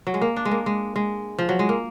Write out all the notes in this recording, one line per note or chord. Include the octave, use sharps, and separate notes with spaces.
F#3
G#3
A#3
D4
G#3
A#3
G#3
G#3
F3
F#3
G#3
A#3